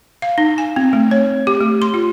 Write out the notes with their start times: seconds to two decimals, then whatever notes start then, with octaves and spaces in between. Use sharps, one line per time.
0.22 F5
0.38 D#4
0.58 G#5
0.76 C4
0.93 A3
1.11 C#5
1.47 G4
1.61 A3
1.82 C6
1.94 F4